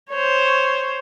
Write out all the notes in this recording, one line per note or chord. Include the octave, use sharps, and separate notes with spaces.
C5 C#5